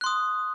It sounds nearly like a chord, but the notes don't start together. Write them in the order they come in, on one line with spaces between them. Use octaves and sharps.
F#6 C6 D#6